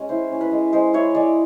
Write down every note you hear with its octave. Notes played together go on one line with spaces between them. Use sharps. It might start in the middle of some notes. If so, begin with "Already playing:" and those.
Already playing: G#3 C#4
E4 C5
C#4
B4
G#3
G#3 C5
E4 C#5
G#3 D5